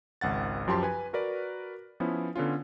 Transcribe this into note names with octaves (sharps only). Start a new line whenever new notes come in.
G#1 C#2 F#5 A6
F#2 F3 G4 A5 C6
B4 G#5
F#4 A#4 B4 D5
F3 B3 C#4 E4
D3 B3 C#4 F4